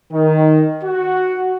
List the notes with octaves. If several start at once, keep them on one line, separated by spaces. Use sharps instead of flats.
D#3
F#4